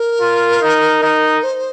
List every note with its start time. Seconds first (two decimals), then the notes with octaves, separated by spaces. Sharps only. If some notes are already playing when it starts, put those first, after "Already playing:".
Already playing: A#4
0.21 F4
0.62 D#4
1.02 D#4
1.43 C5